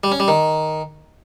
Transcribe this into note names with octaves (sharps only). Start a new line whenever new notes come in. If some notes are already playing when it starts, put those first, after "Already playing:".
G3
C#4
G3
D#3